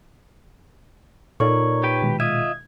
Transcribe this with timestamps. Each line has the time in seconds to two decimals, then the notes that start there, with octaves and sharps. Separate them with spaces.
1.40 A#2 D#4 A4 A#4 C#5 D5 C#6
1.83 G4 B4 G5
2.02 B2 D#3 G#3
2.20 F4 D#5 E5 G#6